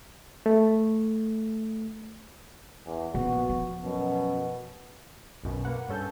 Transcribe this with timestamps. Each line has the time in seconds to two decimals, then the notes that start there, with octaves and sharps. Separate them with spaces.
0.46 A3
2.86 E2
3.15 A#1 B3 F#4
3.49 F3
3.84 F#2 B2
5.44 B1 F#2 B2
5.65 A#3 B4 F#5
5.89 G2 C#4 A4 G6